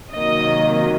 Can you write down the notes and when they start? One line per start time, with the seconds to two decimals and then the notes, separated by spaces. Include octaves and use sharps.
0.13 C3 D#3 F#3 A#3 D#5